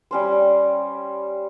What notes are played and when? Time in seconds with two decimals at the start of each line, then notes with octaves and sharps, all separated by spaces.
0.11 G3 C#4 C5